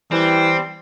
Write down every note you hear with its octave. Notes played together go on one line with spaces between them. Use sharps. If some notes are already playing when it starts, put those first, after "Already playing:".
E3 G3 C4